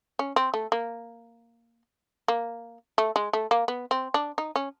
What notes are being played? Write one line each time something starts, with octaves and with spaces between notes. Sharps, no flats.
C#4
C4
A3
A#3
A#3
A3
G#3
A3
A#3
B3
C4
D4
D#4
C#4